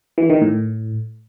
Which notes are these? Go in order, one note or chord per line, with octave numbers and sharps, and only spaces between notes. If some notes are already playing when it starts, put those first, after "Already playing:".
E3
D#3
A2